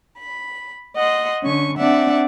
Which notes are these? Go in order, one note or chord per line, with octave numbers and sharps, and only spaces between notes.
B5
D#5 F#5 C6
D3 C#4 C#6
C4 D4 D5 E5 F#5